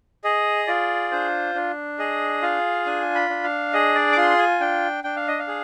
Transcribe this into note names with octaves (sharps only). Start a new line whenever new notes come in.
G#4 D#5
F4 D5
D4 C5
D4
G#4 D#5
F4 F5
D4 G#5
B5
D4
F5
G#4 D#5
D5
D6
F4 C6
G#5
D4 G5
D4 G5
F5
D#5
F5
G#4